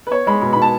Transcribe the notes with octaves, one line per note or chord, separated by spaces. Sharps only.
B4
B3 C#5
G#3 B5
B2 B5
B2 B5
A5